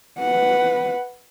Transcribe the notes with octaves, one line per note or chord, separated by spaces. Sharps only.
B4 F#5